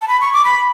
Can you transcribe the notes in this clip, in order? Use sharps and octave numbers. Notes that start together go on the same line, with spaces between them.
A5
B5
C#6
D6
B5